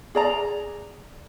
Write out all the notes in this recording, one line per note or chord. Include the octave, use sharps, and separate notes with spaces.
G#4 D5 A#5